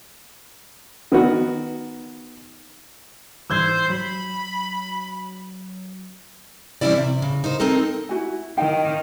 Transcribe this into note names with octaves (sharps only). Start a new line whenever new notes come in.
D#3 B3 F#4
G#2 E3 G3 C5 E6 G6 G#6
F#3 B5
E3 G3 C4 C#4 E4 D5
C3
C#3
D#4 A#4 C5
G#3 C4 D#4 A4 A#4
E4 F#4 G#5
D#3 E4 F5 G5